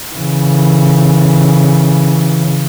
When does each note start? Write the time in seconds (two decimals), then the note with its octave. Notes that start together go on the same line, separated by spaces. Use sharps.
0.14 C#3 E3